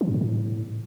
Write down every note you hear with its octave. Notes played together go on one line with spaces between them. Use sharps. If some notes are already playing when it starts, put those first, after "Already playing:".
E3
G2
G#2
A2